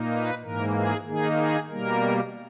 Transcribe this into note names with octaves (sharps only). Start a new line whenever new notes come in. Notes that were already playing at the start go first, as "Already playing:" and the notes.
Already playing: A#2 A#3 D#4
B4
G#2 E3 A#3 A#4
G#4
D#3 A#3 D#4 G#4
G#4
B2 G3 A#3 A#4